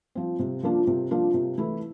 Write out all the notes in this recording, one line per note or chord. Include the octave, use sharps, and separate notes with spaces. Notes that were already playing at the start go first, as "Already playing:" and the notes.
F3 C4
C3
F3 A#3 D4 F4
C3
F3 A#3 D4 F4
C3
E3 A3 E4